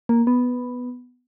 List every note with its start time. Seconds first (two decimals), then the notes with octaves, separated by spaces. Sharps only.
0.09 A#3
0.27 B3